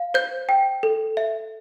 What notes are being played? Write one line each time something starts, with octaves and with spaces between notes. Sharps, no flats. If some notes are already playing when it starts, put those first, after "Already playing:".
Already playing: F5
C5 G6
G5
A4
E5